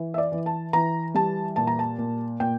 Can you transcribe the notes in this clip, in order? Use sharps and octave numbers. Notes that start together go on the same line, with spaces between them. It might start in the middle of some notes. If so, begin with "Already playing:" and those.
Already playing: E3
E5
D5
E3
A5
E3 A#5
G3 A5
A#2 A5
A#5
A5
A#2
A#2 G5